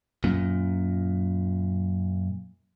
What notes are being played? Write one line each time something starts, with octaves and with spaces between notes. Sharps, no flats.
F#2 A#2